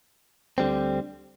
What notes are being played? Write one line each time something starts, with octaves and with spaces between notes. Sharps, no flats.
D2 D3 G3 C4